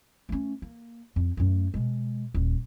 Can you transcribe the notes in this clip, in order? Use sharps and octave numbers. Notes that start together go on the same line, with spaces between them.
A3 C#4
A#3
F2
F#2 A3
B2 G#3
D#1